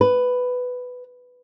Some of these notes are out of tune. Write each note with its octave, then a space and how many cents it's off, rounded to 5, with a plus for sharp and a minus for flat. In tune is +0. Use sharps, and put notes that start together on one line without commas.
B4 +10